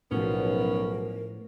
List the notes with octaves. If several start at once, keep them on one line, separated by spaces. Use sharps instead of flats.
B1 A2 F3 B3 C#4 A#4